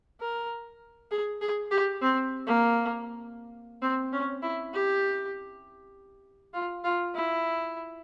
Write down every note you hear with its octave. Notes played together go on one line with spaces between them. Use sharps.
A#4
G#4
G#4
G4
C4
A#3
C4
C#4
E4
G4
F4
F4
E4